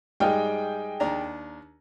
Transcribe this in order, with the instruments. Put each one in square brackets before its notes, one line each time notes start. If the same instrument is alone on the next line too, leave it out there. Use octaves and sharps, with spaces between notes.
[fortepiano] G#2 G3 F6 [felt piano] G#4 D#5 G5
[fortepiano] D#2 D4 A#5